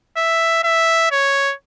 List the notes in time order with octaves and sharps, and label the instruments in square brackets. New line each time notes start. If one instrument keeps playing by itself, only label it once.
[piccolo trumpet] E5
E5
C#5